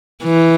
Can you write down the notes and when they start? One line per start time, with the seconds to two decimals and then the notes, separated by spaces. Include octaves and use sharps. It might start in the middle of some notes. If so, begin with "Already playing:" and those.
0.24 E3